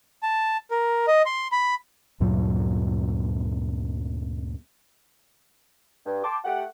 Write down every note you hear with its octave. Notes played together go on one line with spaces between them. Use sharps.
A5
A#4
D#5
C6
B5
D2 G2 A#2 F#3
G2
G5 A5 C6 D6
A3 G4 F#5